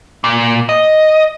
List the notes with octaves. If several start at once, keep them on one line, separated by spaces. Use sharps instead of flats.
A#2
D#5